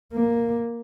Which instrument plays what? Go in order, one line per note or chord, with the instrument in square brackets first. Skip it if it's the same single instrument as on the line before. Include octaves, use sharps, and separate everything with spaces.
[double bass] A#3